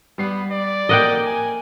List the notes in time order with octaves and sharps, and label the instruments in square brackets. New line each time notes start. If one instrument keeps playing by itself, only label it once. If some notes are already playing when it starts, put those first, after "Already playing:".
[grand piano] G3 C7 [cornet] B3
[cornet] D5
[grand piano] A#3 [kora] D#5 F#5 G5
[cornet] G#5